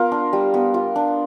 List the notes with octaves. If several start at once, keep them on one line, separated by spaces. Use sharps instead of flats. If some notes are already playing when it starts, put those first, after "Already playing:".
Already playing: B3 F4 A#4
D4
G3
B3
F4
D4